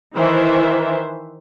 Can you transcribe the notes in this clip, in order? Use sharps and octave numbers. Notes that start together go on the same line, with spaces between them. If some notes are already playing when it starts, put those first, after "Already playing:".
D#3 E3 C5 E5